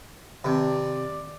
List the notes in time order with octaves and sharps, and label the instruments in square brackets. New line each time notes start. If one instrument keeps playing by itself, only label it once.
[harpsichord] C3 [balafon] D#3 C4 [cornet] D5